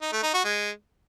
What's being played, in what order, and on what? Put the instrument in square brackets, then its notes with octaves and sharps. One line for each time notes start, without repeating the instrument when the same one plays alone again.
[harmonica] D#4
A3
D#4
F#4
G#3